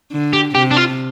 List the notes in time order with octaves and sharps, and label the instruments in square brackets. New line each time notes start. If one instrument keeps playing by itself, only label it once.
[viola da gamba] D3
[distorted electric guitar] G4
[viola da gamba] C3 [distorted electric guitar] G4
[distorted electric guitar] D4
F4